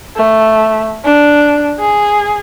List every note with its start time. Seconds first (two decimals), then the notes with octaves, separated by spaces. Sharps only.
0.16 A3
1.05 D4
1.80 G#4